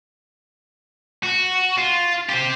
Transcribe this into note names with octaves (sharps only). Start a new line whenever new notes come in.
F#4
F4
G4 C5